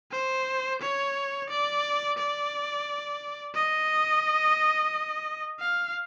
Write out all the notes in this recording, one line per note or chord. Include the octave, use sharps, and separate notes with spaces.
C5
C#5
D5
D5
D#5
F5